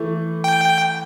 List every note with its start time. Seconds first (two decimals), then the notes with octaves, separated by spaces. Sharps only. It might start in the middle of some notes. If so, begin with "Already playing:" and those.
Already playing: E3 A3
0.44 G5